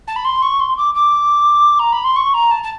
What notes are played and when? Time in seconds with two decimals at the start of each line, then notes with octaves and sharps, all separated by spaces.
0.07 A5
0.16 B5
0.24 C6
0.42 C#6
0.60 C6
0.77 D6
0.95 D6
1.79 A#5
1.92 B5
2.04 C6
2.16 C#6
2.34 A#5
2.51 A5
2.63 A5